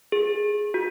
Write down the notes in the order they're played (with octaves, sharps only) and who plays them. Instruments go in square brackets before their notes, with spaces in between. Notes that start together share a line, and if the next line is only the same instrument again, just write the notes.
[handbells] G#4
F#4